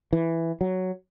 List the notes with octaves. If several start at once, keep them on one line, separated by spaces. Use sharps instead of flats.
E3
F#3